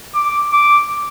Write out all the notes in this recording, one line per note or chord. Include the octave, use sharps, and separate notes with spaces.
D6
D6